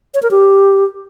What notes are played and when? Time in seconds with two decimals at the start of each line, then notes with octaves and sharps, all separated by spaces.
0.14 C#5
0.23 A#4
0.31 G4